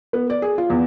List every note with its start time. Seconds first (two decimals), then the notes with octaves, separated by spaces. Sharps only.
0.13 B3
0.30 D5
0.42 G#4
0.58 F4
0.70 E2